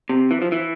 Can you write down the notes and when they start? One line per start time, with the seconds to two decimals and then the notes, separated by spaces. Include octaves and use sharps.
0.09 C3
0.31 E3
0.42 F3
0.52 E3